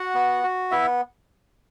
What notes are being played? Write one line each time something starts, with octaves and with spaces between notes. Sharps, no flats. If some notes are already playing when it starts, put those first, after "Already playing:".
Already playing: F#4 F#5
B3
F#4
B3 E4 E5